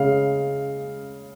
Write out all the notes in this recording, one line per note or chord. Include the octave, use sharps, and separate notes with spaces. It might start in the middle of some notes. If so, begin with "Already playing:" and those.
Already playing: C#3 G#3 F5